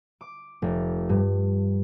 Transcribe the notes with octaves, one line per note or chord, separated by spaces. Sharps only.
D6
F1
G2